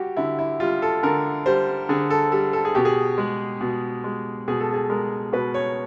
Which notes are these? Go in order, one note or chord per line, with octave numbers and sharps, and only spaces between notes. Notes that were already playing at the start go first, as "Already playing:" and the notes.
Already playing: G3 F#4 G4
D3 E4
E4
G3 F4
A4
D3 A#4
G3 C5
D3 G#4
A4
G3 A4
A4
G#4
B2 G4
G#4
G#3
B2
G#3
B2 G#4
A4
G#4
G#3 A#4
B2 B4
C#5